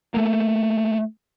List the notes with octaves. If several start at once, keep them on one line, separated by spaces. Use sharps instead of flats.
A3 A#3